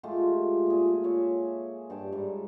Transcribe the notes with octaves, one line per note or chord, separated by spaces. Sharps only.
G#3 A3 F4 G4
A#2 G#4
C#5 E5
G2 G5 A5
G#2 G3